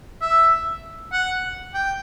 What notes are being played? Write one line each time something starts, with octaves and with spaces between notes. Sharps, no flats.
E5
F#5
G5